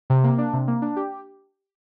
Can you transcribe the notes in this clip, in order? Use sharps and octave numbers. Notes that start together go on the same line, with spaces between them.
C3
A#3
D4
C3
A#3
D4
G4